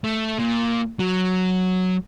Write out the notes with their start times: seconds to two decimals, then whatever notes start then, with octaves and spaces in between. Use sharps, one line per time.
0.04 A3
0.39 A#2
0.99 F#3